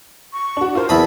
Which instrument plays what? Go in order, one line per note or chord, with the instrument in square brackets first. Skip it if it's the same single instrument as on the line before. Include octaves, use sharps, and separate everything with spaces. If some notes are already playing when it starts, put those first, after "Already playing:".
[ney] C#6
[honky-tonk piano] D4 F#4
[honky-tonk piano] F4 C5 [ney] A#4
[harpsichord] E2 B5 D#6 [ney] E4 [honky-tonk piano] A5